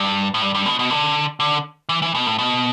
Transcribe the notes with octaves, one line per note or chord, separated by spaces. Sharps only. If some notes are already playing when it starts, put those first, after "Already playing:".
Already playing: G2
A2
G2
G2
B2
B2
D3
D3
E3
E3
B2
A2
B2